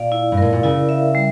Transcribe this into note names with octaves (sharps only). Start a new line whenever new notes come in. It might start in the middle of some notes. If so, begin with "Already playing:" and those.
Already playing: A#2 D5 F5
E4
G2
A2 A#4
A#2
C#3 E4
E5
G3